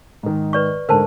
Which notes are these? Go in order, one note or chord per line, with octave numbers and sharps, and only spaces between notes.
G#2 D#3
B4 D5 C#6
G#2 D3 A#4 C5 A5